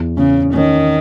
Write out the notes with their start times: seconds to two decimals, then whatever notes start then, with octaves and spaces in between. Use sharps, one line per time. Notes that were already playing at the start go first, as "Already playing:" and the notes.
Already playing: E2
0.17 C#3 C#4
0.54 D#3 C#4